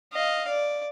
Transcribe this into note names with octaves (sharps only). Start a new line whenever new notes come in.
D#5 F5
D5